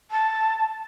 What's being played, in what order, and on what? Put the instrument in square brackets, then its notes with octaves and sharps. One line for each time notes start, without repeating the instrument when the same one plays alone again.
[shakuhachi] A5